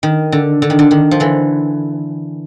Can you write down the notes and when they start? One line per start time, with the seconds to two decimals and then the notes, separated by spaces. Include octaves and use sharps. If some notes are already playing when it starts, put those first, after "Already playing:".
0.03 D#3
0.32 D3
0.62 D3
0.70 D#3
0.79 D3
0.91 D#3
1.11 F3
1.20 D3 E3